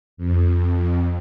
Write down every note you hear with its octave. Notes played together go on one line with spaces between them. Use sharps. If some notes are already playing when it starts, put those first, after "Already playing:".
F2